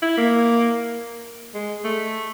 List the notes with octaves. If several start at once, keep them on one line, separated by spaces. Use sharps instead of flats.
E4
A#3
G#3
A3